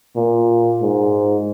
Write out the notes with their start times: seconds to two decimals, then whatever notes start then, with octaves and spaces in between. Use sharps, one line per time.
0.16 A#2
0.82 G#2